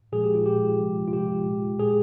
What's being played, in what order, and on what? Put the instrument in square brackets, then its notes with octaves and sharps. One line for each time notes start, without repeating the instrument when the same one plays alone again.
[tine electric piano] A#2 F3 G#3 G#4
G4
F4
A#2 F3 G#3 G4
C3 F3 G#3
F4
C3 F3 G#3 G4
A#2 G#3
A#2 G#3 G#4